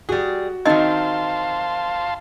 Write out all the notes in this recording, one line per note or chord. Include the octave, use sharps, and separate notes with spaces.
G3 F#4 G#4
D#3 C4 D#4 D#5 F5 A5 C6